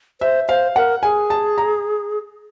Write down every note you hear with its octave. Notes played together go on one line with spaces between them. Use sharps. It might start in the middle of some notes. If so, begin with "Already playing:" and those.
C5 E5
C5 F5
A#4 F#5
G#4 G#5
A5
A#5